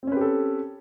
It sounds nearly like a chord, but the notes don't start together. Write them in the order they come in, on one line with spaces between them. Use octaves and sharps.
C4 C#4 B4 G4 A4